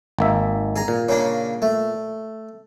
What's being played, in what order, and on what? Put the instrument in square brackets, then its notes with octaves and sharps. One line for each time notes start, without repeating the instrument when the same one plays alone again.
[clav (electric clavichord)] G#1 A#3 E5
[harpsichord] G#4 A#5
[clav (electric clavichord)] A#2
[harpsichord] C#3 A#3 D4
A3